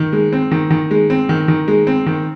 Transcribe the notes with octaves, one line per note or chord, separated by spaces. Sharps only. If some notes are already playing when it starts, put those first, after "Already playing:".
Already playing: D#3
G#3
C4
D#3
D#3
G#3
C4
D#3
D#3
G#3
C4
D#3